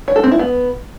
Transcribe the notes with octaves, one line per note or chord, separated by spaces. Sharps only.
C#5
A4
C4
E4
B3